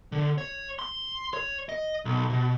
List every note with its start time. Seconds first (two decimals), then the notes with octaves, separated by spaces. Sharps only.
0.12 D3
0.38 C#5
0.79 C6
1.34 C#5
1.69 D#5
2.05 B1
2.30 B2